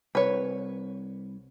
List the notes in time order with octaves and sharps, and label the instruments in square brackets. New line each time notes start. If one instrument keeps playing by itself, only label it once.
[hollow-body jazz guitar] C2 [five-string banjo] B4 C#5